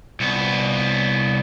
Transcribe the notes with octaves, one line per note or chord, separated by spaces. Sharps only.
C2 B3